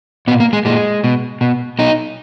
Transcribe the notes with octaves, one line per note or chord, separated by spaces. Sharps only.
A#2 B3
A#3
G#3
A#2 G#3
B2
B2
B2 D#4